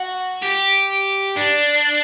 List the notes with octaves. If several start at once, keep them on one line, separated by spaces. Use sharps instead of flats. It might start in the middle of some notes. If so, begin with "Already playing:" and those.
Already playing: F#4
G4
D4